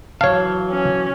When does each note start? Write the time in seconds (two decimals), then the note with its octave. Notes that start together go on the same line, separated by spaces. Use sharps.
0.21 E3 F#3 C#5 F5 A5
0.69 C#4